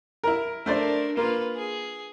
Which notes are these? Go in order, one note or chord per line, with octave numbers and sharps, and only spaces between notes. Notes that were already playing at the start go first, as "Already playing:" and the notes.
E4 A#4
A3 D4 A#4 C5 D5
A#3 F4 B4
G#4